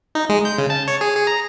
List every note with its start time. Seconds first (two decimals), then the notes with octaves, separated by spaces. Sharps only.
0.15 D#4
0.29 G#3
0.45 G6
0.58 C#3
0.70 A5
0.88 C#5
1.01 G#4
1.15 G#4
1.27 A#5